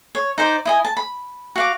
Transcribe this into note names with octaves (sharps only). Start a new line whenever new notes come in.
C#5
D#4 C5 D5
E4 D#5 G#5
A5
B5
F#4 F5 D6